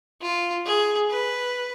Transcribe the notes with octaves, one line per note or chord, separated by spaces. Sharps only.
F4
G#4
B4